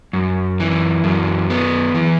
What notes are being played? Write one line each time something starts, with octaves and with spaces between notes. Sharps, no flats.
F#2
E3
F#2
B3
E3